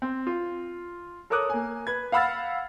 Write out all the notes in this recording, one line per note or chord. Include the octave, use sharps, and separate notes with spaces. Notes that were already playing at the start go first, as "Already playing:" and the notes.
C4
F4
A4 A#4 C#5 D6 D#6 F#6
A#3 G#5
B4 G#6
F5 F#5 B5 E6 F6 A6